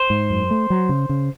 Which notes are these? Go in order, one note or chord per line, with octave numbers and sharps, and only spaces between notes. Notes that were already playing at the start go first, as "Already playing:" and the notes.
Already playing: C5
G#2
F#2
A3
F#3
C#3
C#3